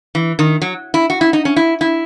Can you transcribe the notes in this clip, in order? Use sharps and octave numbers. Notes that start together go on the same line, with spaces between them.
E3
D#3
F#3
E4
F#4
E4
D#4
C#4
E4
E4